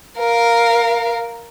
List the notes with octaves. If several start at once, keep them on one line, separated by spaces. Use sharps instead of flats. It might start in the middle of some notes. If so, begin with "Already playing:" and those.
A#4 F5